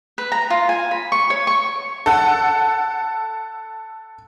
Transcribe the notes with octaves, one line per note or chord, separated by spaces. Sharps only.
B4
A#5
F4
G#5
B5
C#6
C#5
C#6
A4 F#5